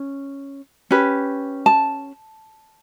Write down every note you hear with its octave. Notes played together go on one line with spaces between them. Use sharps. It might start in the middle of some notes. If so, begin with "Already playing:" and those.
Already playing: C#4
C#4 G4 B4
A5